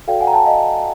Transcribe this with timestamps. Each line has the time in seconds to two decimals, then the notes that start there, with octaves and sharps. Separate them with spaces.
0.08 F#4 A4 D5 F5 G5
0.21 F#5 G#5
0.27 A#5
0.33 G5 A5
0.46 D#5 F5